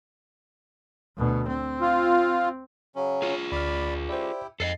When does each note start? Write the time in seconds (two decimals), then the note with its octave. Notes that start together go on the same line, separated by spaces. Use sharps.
1.18 D2 B2
1.47 C4
1.81 F4
2.96 C#3 F#3 C#4
3.22 F4 G#4
3.52 D2 D5 B5 F6
4.09 E4 G4 C5 D5
4.60 F2 G#2 A4 D5 D#5 A6 C7